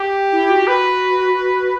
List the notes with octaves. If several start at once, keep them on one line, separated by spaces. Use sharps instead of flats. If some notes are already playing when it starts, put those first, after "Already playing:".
Already playing: G4
E4
F#4
B4